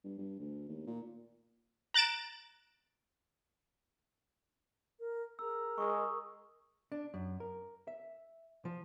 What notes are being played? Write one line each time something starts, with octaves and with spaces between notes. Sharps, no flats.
G2
G2
D2
D#2
A#2
A#5 F#6 A6 D7 E7
A#4
G#4 A#4 A#5 E6
G#3 C#6 D#6
D4
F#2
A#4
E5
F3